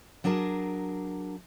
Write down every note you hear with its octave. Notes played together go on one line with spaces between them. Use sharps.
F#3 D4 G#4 A#4 A5